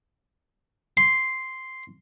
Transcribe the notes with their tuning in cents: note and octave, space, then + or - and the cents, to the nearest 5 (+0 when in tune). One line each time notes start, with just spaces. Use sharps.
C6 +0